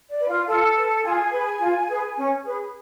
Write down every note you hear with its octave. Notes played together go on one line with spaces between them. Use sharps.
D5
B4
F4 F5
F4 A4 A5
B4
F4 G#4 G#5
G#4 B4
F4
G#4 B4
C#4
G#4 B4